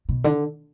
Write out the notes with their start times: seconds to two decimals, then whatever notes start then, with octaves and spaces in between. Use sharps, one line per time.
0.09 B2
0.24 D3